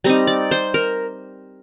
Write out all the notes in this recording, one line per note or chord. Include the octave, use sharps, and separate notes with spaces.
G3 C4 D#4 A#5
D5
C5
A#4